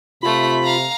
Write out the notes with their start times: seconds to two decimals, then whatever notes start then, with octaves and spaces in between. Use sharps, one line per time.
0.23 C3 A3 F4 B5 B6
0.63 F5 A#5